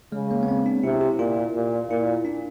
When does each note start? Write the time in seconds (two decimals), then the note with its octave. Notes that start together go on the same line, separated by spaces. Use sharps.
0.12 C#3 G#3
0.31 A#3
0.43 B3
0.48 C4
0.66 D4
0.83 C3 E4
1.01 G4
1.19 A#2 F4
1.55 A#2
1.90 A#2 E4
2.25 D4